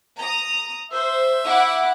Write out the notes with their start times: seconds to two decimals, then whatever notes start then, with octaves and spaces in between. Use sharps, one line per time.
0.18 A#5 D#6
0.91 C5 E5
1.45 E4 F#5 D6